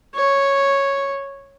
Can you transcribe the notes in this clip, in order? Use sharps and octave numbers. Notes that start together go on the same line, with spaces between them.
C#5